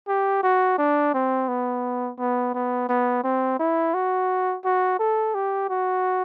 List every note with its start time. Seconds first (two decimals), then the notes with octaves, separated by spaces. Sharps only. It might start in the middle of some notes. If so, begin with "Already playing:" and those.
0.08 G4
0.43 F#4
0.78 D4
1.14 C4
1.48 B3
2.19 B3
2.54 B3
2.89 B3
3.24 C4
3.59 E4
3.94 F#4
4.65 F#4
4.99 A4
5.34 G4
5.69 F#4